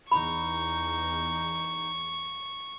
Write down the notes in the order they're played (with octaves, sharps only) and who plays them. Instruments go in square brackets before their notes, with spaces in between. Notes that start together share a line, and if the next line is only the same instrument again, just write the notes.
[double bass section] E2 [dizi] D#4 [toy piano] B5 [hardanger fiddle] C#6